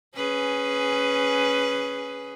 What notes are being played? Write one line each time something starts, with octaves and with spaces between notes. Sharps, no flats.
C#4 G#4 B4